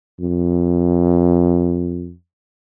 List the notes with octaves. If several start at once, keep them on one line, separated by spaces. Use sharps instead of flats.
F2